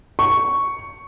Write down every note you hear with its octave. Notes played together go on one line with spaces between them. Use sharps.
C#6